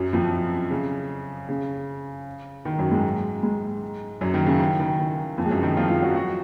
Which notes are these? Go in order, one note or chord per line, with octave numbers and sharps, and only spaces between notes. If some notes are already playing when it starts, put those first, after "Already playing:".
Already playing: F#2 F#3
F2 F3
C#3
C#3
D#3
F#2 F#3
G#2 G#3
G#2 G#3
F#2 F#3
D#3
C#3
D#3
D#3
D#3
F2 F3
G#3
F#2 F#3
D#3 D#4
F3 F4
F3 F4
F#3 F#4
F#3 F#4